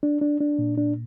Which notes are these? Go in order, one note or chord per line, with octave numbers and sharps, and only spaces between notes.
D4
D4
D4
A#2
D4